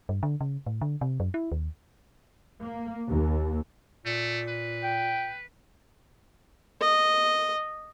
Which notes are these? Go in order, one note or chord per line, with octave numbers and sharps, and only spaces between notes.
G2
D3
C#3
A2
D3
C3
F#2
E4
D#2
A#3
D#2
A#2 A3
B4
G5
D#5